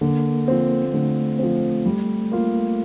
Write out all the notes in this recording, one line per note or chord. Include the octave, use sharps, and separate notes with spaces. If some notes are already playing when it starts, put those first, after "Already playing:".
D3 A#3
F3 C4
D3 A3
F3 C4
G3
A#3 F4